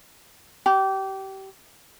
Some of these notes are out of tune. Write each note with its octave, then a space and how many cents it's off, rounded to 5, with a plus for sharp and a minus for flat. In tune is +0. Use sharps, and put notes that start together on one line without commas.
G4 -25